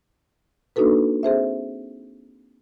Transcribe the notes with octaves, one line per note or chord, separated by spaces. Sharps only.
A#3 D4 D#4 F#4 A4 B4
C4 G#4 C5 E5